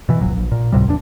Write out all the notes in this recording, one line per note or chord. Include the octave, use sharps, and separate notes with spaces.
B2 E3
D1 A#1 F#3
A#1
A#2
C#2 A2 C3 G3
F1 E2 C#3 D4